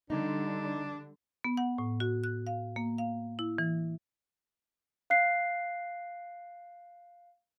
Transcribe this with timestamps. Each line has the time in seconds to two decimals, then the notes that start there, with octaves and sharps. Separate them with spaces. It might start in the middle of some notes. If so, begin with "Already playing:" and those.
0.10 D3 G3 D4 D#4
1.44 B3
1.57 F#5
1.78 A2
2.00 F#4
2.24 F#6
2.47 F5
2.76 A#3
2.98 F5
3.39 E4
3.58 E3
5.10 F5 F#6 C7